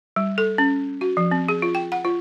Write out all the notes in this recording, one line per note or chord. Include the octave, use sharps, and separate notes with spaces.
G3
A4
C#4
F#4
F3
C4
G#4
F4
G5
F#5
F4